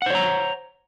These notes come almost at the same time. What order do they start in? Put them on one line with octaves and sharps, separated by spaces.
F#5 C5 C#5 A#5